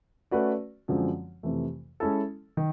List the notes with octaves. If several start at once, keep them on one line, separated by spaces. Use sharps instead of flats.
A3 C#4 F#4 B4 D5
F#2 D3 F3 G#3 C4
F2 C3 E3 A3
G#3 C#4 E4 A4
D#3